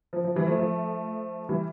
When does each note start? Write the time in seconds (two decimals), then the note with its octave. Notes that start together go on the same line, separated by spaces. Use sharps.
0.13 F3
0.24 F3
0.36 E3 G3
0.47 F3 A3
0.58 F3 A3
1.49 E3 G3